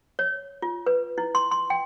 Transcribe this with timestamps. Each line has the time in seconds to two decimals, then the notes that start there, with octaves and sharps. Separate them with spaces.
0.19 C#5
0.62 F4
0.86 B4
1.18 E4
1.35 C6
1.51 C6
1.70 G5